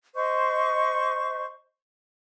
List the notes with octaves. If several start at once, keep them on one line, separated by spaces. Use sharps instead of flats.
C5 D#5 C#6